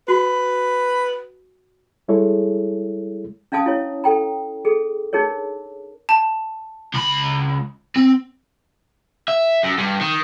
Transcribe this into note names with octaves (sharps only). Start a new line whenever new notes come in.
F#4 B4
G3 G#3 E4 G#4 A4 C#5
C#4 D4 F5 A5 D#6
E4 C#5
A4 G5 A#5
G#4 A4
D4 D#4 G#4 A#4 C#5
A5
C#2 B5
C4
E5
F#2
G2
D#3